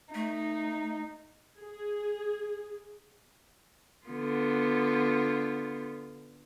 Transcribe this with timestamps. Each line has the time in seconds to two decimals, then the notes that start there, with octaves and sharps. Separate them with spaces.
0.14 A3 D#4
1.58 G#4
4.07 D3 B3 F4